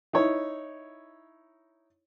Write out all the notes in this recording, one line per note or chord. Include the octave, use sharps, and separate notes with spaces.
D#4 E4 C#5